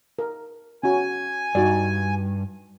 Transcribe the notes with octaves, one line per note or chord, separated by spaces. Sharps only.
A#4
C#4 F#4 G#5
G2 D#4 F#4 D5